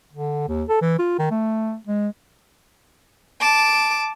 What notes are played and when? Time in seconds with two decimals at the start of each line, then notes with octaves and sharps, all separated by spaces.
0.13 D3
0.48 D#2
0.69 A4
0.81 E3
0.99 F4
1.19 D#3
1.31 A3
1.87 G#3
3.40 A5 D6